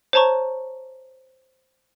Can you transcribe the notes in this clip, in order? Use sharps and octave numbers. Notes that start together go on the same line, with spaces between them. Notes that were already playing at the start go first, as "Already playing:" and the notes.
C5 C#5 A5 A#5 C#6